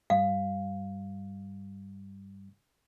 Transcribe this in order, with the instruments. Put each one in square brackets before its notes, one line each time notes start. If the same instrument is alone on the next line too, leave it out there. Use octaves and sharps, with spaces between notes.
[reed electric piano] G2 G3 [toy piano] F5